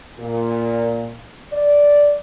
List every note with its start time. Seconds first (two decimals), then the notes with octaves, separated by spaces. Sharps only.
0.19 A#2
1.53 D5